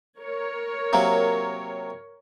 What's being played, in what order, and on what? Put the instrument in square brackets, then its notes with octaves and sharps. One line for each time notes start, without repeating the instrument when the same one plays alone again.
[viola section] A#4 C#5
[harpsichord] C3 F#3 A#3